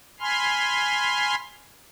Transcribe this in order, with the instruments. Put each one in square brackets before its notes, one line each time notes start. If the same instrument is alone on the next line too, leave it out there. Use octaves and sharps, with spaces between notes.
[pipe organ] G#5 B5 C6 F6